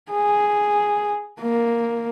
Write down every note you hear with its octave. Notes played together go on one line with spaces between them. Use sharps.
G#4
A#3